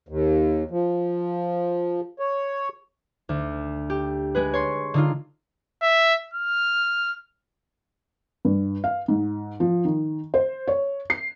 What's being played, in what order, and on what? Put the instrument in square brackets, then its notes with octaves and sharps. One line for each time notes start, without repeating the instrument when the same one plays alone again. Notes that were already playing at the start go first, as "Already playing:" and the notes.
[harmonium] D#2
F3
C#5
[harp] D2
G4
G#3 G#4 B4
C#5 C6
D3 D#4 F4
[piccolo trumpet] E5
F6
[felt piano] G2
F5
G#2
F3
D#3
C5
C#5
C7